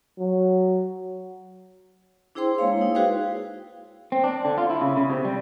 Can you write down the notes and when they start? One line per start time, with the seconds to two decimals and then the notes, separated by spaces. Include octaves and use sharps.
0.19 F#3
2.35 D4 E4 G#4 C5 G5 C6
2.58 G#3 A#3 C#5 F5
2.81 D#4 E4
2.95 F#4 G#4 B4 C5 F5 G5
4.12 C4
4.24 D4
4.45 D3
4.58 F4
4.70 E4
4.81 C#3
4.97 C#3
5.10 C3
5.25 G3